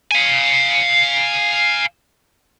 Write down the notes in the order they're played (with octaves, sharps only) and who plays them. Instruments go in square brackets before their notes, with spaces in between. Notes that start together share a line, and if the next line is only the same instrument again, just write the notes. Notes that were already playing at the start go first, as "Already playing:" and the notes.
[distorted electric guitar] F5 G#5